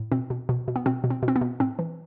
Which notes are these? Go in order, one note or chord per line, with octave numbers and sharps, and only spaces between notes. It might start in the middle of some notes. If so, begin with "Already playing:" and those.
Already playing: A2
B2 C4
B2
B2
B2
B3
B2 C4
B2
C4
B2
C4
B3
B2
A2 C4
E3